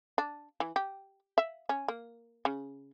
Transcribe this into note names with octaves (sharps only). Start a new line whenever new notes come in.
D4
E3
G4
E5
C#4
A#3
C#3